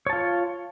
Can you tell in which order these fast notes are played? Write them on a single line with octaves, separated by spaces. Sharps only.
C#5 A5 F4